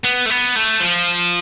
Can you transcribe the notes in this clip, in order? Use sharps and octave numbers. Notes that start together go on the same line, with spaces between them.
B3
A3
B3
A3
F3